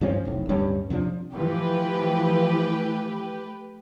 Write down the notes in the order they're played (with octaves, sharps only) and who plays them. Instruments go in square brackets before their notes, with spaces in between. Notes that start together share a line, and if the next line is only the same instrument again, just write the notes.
[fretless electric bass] G2 F3 C4 C#4
F1 B1 A2
D1 G2 G3 C#4
F2 C3 F3 D4
[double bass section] E3 F3 [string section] A3 G4 B4